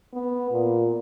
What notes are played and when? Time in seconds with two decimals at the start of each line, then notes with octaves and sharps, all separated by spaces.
0.13 B3
0.51 A#2